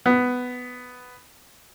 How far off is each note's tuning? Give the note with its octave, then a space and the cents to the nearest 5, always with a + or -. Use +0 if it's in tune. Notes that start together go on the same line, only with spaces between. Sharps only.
B3 +10